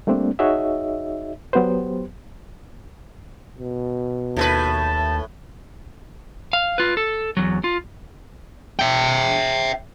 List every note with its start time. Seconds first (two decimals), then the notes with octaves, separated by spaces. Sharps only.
0.07 G3 A3 A#3 C4 D4
0.39 D#4 F#4 G#4 C#5 D#5 E5
1.53 F#3 B3 G4 B4 C5
3.59 B2
4.36 D#2 A2 A4 B4 A5
6.53 F5
6.78 F4 B4
6.97 A4
7.37 E2 F#3
7.64 F4
8.79 E5 G5